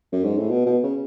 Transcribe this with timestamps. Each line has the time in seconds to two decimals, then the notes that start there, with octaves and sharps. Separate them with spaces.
0.12 F#2
0.25 G#2
0.37 A2
0.50 B2
0.66 B2
0.83 C#3